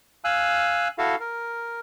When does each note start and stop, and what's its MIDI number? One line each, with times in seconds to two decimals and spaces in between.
0.24 0.88 77
0.24 0.88 80
0.24 0.88 88
0.24 0.88 90
0.98 1.15 64
0.98 1.15 66
0.98 1.15 69
0.98 1.15 77
1.20 1.80 70